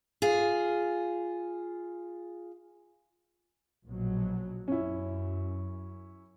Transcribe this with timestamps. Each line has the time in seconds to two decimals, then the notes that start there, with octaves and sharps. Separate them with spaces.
0.22 F4 G#4
3.85 A#1 B2 F#3
4.68 F#2 C#4 E4